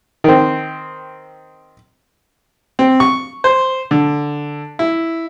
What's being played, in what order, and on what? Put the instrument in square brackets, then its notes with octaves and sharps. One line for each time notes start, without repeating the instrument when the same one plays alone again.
[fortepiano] D#3 C4
C4
C#6
C5
D3
E4